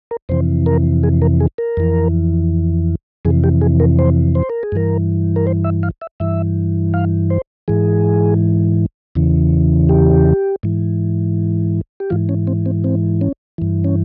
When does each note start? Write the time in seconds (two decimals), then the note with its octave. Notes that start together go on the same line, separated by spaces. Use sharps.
0.11 A#4
0.29 F2 C3 E3 C5
0.66 A#4
1.03 G#4
1.22 A#4
1.40 G#4
1.58 A#4
1.77 F2 E3
3.25 F2 C3 E3 G#4
3.44 G4
3.61 G#4
3.80 A#4
3.99 C5
4.35 C5
4.50 A#4
4.63 G#4
4.72 G2 E3 A#4
5.36 A#4
5.47 C5
5.64 E5
5.83 F5
6.01 E5
6.20 G2 E3 E5
6.94 F5
7.30 C5
7.68 G#2 E3 G#4
9.15 E2 C#3 E3
9.89 G4
10.63 G#2 E3
12.00 G4
12.10 G#2 E3 F4
12.29 C#4
12.47 C4
12.66 C4
12.84 C4
13.21 C#4
13.58 G2 E3
13.84 C#4